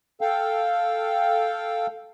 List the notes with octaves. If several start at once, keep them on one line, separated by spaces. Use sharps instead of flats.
A4 F5 G5